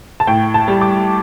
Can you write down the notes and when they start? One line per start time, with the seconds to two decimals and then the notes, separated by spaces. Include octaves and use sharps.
0.20 A5
0.27 A2 G5
0.54 A5
0.68 G3
0.81 D6